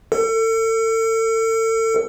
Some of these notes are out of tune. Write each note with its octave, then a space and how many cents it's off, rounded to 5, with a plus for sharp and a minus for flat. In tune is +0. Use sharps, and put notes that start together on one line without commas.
A4 +35